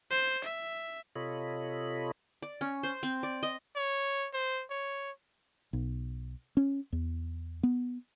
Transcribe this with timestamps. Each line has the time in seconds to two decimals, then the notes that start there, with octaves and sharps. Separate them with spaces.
0.11 C5
0.44 E5
1.16 C3 F4 A4 C#5 D#5 B5
2.42 D5
2.61 C#4
2.83 C5
3.03 C4
3.23 D5
3.43 D#5
3.76 C#5
4.33 C5
4.70 C#5
5.73 B1
6.57 C#4
6.92 E2
7.63 B3